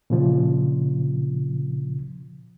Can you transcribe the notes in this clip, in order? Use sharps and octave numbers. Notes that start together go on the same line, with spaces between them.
A#2 C#3 F3